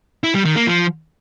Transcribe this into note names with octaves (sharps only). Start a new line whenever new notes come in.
E4
G3
D#3
A#3
F3